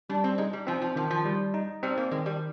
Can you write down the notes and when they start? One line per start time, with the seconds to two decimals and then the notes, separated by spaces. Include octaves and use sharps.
0.10 G3 D4
0.24 C4
0.38 G#3 D#4
0.53 G3
0.67 F3 C4
0.82 F3
0.96 D#3 F3
1.10 F3
1.25 G3
1.54 D#4
1.83 G3 C4
1.97 A#3
2.11 D#3 G#3
2.26 G3